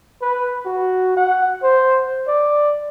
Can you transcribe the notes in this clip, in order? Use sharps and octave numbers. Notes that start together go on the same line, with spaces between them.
B4
F#4
F#5
C5
D5